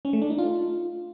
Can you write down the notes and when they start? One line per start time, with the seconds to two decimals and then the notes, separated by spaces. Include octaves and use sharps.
0.05 C#4
0.13 A3
0.22 D4
0.30 D#4
0.38 F4